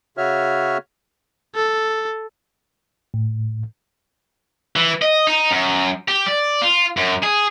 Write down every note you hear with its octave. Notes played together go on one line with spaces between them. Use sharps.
C#3 F#4 C#5 E5 F6
A4
A2
E3
D#5
D#4
F#2
G4
D5
F4
F#2
G#4